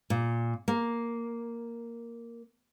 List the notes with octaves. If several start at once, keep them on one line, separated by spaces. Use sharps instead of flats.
A#2
A#3